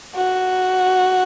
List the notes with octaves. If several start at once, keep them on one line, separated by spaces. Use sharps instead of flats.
F#4